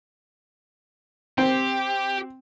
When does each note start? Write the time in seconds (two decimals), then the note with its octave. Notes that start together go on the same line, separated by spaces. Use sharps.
1.38 C4 G4